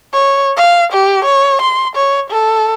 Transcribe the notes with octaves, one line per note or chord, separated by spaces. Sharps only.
C#5
F5
G4
C#5
C6
C#5
A4